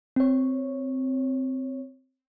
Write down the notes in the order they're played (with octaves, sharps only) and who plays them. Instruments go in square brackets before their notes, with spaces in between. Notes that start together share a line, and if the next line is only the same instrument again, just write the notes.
[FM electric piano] C4 C#5